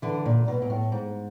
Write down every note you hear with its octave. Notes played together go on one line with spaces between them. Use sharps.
D3 E3
A#2
B2
A#2
A2
G#2